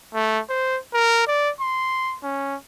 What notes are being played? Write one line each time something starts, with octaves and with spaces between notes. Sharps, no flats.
A3
C5
A#4
D5
C6
C#4